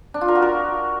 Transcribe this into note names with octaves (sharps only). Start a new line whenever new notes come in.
D4
F4
A#4
F#4
A#4